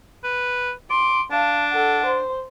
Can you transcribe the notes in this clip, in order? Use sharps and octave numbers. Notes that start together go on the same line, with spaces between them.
B4
C6 D6
D4 F5 A5
A4 F#5
C5